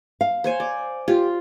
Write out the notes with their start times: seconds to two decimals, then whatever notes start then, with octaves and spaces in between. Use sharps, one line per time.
0.21 F5
0.44 C5 C#5 G#5
0.60 D5
1.08 F4 G4